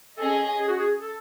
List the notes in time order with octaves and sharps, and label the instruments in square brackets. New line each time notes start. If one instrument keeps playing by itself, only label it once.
[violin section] C#4 G#4 D#5 [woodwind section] A4
[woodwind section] G#4
F#4
G#4
A4